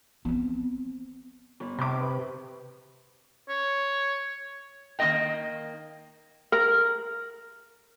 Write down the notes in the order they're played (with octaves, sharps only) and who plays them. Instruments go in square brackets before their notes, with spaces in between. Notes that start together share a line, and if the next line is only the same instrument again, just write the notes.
[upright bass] B3 C4
[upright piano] G1
[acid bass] C3 [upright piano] C6 D6
[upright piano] B4
[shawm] C#5
[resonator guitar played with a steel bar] D#3 A#3 B3 F#4 D#5 G5
[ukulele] A#4